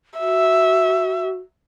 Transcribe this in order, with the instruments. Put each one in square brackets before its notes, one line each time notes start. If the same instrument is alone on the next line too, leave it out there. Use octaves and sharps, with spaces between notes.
[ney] F#4 [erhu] E5